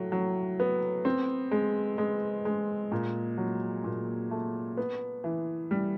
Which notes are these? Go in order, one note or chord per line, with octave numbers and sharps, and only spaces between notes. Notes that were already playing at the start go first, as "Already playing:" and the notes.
Already playing: A2 F#3
F#3
B3
C4
G#3
G#3
G#3
A#2
F#3
A#2
A3
B3
E3
G3